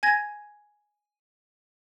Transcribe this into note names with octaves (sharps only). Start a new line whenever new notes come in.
G#5 G#6 A#6